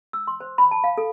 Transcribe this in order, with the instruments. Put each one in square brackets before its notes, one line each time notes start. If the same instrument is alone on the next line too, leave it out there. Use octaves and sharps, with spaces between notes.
[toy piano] E6
C6
C5
B5
A5
F5
A4